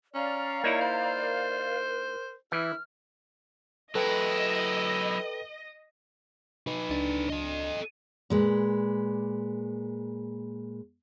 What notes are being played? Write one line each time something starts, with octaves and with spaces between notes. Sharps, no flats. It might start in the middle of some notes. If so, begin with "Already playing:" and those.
C#4 D5 F5 A#5
A#3 D#4 E4 C#5
C5
A#4
E3 E4 F6
F#3 E4 A4 B4 D#5 G5
D#4 B4
C#2 D4
A4 D#5
A#2 G#3 B4